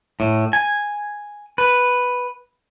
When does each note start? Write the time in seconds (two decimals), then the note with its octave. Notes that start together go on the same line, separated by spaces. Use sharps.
0.20 A2
0.53 G#5
1.58 B4